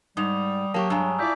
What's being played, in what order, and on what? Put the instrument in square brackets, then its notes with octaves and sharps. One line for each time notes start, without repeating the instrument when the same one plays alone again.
[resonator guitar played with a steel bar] G#2 [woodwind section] G3 [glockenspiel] D#6 F7
[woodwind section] F#3 [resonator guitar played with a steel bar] A#3 G4 [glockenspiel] A5 C#6
[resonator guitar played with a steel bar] G2 G#3 [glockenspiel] G#5 A#5 E6
[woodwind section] E4 F4 D5 [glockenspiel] E6 G6 B6